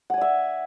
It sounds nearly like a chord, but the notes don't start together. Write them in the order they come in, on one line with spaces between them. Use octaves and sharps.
F#5 G#5 D5 E5